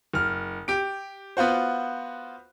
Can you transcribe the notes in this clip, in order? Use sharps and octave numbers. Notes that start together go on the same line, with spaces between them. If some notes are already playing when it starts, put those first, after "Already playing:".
F#1 F6
G4 D7
B3 F4 F#4 C5